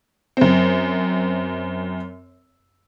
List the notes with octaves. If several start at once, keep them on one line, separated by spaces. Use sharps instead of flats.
F#2 C4